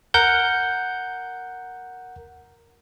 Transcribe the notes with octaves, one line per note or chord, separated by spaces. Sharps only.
A#4 F#5 G6